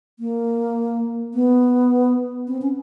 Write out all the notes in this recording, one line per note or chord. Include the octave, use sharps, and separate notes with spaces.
A#3
B3
C4
C#4